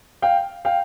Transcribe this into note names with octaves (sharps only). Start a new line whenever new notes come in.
F5 G5
F5 G5